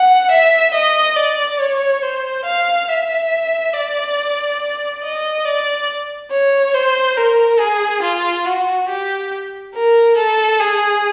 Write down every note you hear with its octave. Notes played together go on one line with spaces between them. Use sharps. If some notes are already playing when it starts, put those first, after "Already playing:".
Already playing: F#5
E5
D#5
D5
C#5
C5
F5
E5
D5
D#5
D5
C#5
C5
A#4
G#4
F4
F#4
G4
A#4
A4
G#4